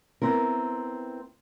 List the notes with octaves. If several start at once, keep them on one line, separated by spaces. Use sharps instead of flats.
B3 C4 E4 A#4